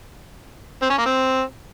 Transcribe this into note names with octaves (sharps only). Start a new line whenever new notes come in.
C4
C#4
A#3
C4